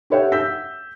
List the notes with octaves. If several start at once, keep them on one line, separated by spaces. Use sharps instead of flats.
G4 A4 C#5 E5 F#5 G5
E6 G6 B6